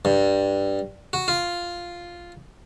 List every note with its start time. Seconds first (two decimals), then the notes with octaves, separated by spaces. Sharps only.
0.05 G2
1.13 F#4
1.28 F4